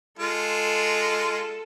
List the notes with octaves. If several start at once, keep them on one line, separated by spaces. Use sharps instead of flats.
G#3 F4 A4